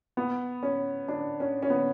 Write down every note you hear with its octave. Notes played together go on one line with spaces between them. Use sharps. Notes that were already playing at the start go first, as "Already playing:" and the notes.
B3
C#4
D4
C#4
C#4
B3